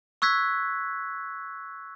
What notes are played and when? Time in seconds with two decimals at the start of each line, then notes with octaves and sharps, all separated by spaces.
0.22 C#6 E6 F#6 G#6 B6